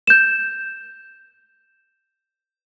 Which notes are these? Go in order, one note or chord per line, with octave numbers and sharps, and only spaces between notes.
G6 E7